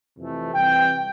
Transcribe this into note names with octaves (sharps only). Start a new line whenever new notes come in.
F2 C3 E3 A3
C3 E3 G3 G5